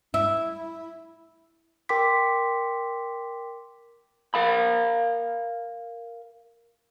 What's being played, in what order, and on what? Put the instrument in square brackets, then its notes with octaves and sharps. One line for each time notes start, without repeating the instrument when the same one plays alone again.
[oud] E4
[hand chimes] A#4 G5 C6 D6 B6
[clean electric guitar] A#4 F5 B5